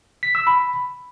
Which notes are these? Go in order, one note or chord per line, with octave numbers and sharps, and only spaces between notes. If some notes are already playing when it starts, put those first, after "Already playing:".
B6
E6
B5